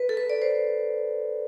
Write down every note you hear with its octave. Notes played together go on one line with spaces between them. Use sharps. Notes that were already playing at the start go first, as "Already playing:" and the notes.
Already playing: B4
A4
B4
D5
C5